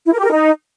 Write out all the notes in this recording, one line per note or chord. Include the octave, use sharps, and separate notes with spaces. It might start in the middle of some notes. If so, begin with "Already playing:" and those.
E4
A#4
G4
A#4
D#4